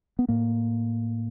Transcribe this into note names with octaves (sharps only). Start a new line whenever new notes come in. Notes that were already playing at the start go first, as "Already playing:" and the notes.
B3
A2 A#3